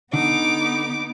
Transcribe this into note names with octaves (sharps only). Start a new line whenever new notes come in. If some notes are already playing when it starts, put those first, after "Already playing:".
D3 B3 D#4 D6